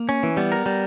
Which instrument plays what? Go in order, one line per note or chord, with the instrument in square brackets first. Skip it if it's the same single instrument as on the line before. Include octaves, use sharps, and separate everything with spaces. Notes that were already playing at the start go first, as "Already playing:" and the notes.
Already playing: [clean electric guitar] A#3
[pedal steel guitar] C#4
E3
[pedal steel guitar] G3 [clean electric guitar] B3
[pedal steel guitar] A#4
G3